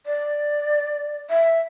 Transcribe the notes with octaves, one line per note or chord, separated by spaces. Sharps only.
D5
E5